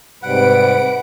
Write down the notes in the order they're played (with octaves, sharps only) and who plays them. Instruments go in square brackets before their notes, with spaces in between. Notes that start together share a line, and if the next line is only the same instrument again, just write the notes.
[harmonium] G#2 C3 G3 [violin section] B4 D7 [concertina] F#5